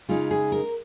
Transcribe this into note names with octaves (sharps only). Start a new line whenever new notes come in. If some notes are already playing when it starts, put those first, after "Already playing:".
C#3 G#3 D#4 F4
G#4
A#4